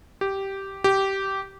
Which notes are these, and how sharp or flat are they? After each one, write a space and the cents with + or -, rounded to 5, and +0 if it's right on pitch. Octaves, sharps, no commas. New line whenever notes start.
G4 -10
G4 -15